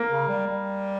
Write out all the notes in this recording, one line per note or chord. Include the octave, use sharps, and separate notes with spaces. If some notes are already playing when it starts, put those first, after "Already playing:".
Already playing: A#3
C#3
G3
G3